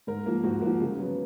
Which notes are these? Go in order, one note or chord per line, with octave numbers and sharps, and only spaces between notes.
G#2 A#4
F3 A#3
G#2 F#4
F3 A#3
C#3
F#3 B3